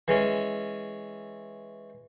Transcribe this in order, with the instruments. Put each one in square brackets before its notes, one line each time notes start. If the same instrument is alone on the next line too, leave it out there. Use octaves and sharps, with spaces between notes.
[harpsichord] E3 G#3 C#4